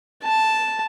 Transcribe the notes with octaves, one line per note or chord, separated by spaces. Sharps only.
A5